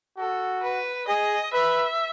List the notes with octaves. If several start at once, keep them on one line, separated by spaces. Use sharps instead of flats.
F#4 A4
B4
G#4 D#5
B4 E5